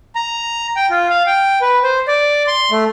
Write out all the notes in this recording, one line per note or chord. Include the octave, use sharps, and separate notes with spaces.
A#5
G5
F4
F5
G5
B4
C5
D5
C6
A3